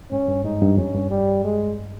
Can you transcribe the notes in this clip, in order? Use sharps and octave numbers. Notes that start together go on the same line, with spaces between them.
G#2 C#4
G2
G#2 D#4
G2
F2 C#4
G2
G3
G#3